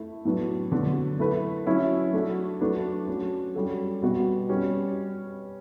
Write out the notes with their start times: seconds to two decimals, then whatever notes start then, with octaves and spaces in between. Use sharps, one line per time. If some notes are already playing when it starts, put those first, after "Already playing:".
Already playing: A3 E4
0.25 A2 F#3 B3 D4
0.72 D3 F#3 B3 D4
1.19 A3 E4 B4
1.66 F#3 C#4 E4
2.13 A3 D4 F#4
2.61 F#3 A3 D4 F#4 B4
3.08 F#3 C#4 F#4
3.55 G3 C#4 F#4 A4
4.02 B2 G3 B3 F#4
4.49 G3 C#4 G4 B4